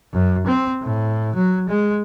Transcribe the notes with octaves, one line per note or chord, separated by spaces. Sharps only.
F#2
C4
A2
F#3
G#3